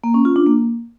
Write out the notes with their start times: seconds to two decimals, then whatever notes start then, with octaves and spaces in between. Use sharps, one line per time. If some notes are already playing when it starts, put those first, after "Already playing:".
0.04 A#3
0.14 C#4
0.25 F4
0.36 D4
0.47 A#3